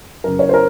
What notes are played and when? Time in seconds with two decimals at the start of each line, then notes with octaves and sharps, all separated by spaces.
0.24 F#2 C#3 A#4
0.39 C#5
0.49 C5
0.54 A#4